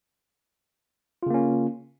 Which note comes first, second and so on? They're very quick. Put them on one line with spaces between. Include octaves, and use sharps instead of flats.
F4 C#3 A#3 C#4